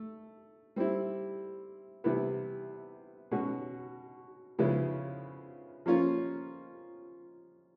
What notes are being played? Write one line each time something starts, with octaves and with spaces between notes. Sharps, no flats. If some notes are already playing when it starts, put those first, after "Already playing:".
Already playing: A3
G3 C4 E4
C3 E3 G3 B3 E4
B2 G#3 C#4 F#4
C#3 F3 G#3 B3 E4
F3 A#3 C#4 F4